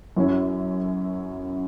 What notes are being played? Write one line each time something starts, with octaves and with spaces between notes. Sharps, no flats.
F#2 F#3 C#4 E4